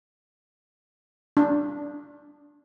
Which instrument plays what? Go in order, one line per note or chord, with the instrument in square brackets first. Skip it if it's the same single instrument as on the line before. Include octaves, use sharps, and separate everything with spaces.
[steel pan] D4